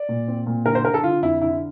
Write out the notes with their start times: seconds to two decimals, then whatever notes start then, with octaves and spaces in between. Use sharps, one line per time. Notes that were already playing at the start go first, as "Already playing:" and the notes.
Already playing: D5
0.09 A#2
0.28 C4
0.47 A#2
0.66 D3 A#4
0.75 C5
0.84 D3 A#4
0.94 A4
1.03 D3 F4
1.22 F2 E4
1.41 D3 E4